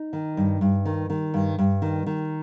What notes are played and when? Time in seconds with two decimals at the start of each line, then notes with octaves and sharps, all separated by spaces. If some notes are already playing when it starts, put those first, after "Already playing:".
Already playing: D#4
0.13 D#3
0.37 G2
0.61 G2
0.85 D#3
1.10 D#3
1.34 G2
1.58 G2
1.82 D#3
2.06 D#3